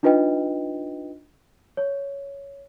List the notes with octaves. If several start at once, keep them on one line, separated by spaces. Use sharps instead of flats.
D4 D#4 F4 B4 D#5 G5
C#5